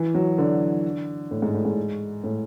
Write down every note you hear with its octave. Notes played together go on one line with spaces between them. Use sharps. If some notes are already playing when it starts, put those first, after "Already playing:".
Already playing: E3
F#3
D3
A2
G#2
A2
G#2
A2